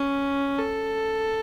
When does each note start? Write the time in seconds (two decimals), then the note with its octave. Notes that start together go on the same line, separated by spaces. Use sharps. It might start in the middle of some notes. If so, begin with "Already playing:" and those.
Already playing: C#4
0.59 A4